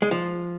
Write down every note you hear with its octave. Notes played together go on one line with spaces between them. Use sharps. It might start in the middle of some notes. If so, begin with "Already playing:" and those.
G#3
F3